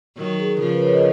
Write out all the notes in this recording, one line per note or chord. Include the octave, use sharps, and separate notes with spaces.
D#3 F#3 A#4
G#4
C#3 F3 A#4
B4
C#5
D#5